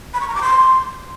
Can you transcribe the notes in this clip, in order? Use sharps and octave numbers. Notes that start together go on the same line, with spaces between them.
B5
C#6
A#5
D6
C6